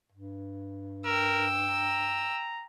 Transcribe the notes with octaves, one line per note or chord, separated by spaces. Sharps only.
G2
A#4 G5 E6
A#5